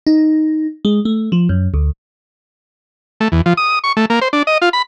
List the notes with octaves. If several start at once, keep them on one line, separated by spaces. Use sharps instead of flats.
D#4
G#3
A3
F3
F#2
D2
A3
E2
F3
D#6
C#6
A3
A#3
C5
D4
D#5
F4
B5